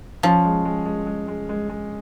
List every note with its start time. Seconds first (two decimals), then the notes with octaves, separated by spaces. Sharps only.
0.23 F3 C#4
0.45 G#3
0.65 G#3
0.86 G#3
1.07 G#3
1.28 G#3
1.49 G#3
1.69 G#3